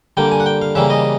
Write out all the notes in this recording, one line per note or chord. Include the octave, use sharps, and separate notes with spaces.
D3 G3 A#3 G5
G#5
F#5
G5
F5
C#3 E3 G3 A#3 E5
D#5